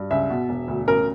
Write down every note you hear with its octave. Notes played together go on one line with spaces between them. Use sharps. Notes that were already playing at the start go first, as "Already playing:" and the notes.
Already playing: G2
C#2 E5
B2
E1
D2
A1 A#4